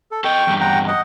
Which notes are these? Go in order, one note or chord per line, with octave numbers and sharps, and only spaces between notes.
A4
A4 D#5 G5 C#6
E2 G2
F#5 G5 A#5
D#5 F#5